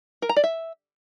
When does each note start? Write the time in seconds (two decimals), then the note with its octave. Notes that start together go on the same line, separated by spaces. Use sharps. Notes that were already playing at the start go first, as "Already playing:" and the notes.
0.22 A#4
0.29 A#5
0.36 D5
0.44 E5